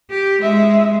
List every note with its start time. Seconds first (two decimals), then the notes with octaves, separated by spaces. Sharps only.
0.10 G4
0.42 G#3 E5